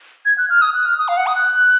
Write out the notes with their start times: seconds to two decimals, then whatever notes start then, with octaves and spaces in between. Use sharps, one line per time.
0.25 G#6
0.38 F#6
0.50 F6
0.62 D#6
0.74 F#6
0.86 F6
0.98 D#6
1.08 F5
1.17 F#5
1.27 D#6
1.36 F#6